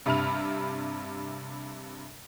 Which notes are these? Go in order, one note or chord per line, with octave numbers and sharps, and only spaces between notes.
G2 C3 E5 B5 F6 F7